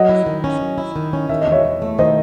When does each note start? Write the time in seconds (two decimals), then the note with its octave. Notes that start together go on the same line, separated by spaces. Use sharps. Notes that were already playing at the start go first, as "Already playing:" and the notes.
Already playing: F#3 D#5 F#5
0.09 E4
0.26 D#3
0.44 C#4
0.61 F#3
0.78 E4
0.96 D#3
1.13 C#4
1.29 D#3 E5
1.41 D#5
1.47 E2
1.52 C#5 E5
1.65 E2
1.82 A3
1.99 D#3 C5 D#5